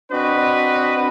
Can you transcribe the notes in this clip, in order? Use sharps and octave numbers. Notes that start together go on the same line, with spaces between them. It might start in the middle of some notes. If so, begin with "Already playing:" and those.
C4 D4 F#4 B4 D#5